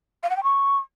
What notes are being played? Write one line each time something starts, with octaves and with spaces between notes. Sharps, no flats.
F5
F#5
G5
C#6